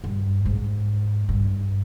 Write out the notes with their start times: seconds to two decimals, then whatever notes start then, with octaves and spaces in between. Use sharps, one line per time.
0.04 G2
0.45 G#2
1.29 G2